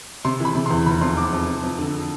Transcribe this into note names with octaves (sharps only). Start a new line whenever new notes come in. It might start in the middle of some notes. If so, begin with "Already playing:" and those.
C3 C6
E3 B5
C3
C6
E2
F1 B5
F2 C6
F2 D6
F2
F2
F2
D3